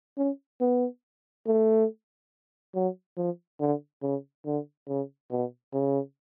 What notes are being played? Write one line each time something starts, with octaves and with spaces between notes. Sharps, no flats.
C#4
B3
A3
F#3
F3
D3
C#3
D3
C#3
B2
C#3